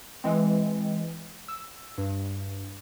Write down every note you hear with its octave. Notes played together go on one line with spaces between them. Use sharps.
E3 G#3 C4
E6
G2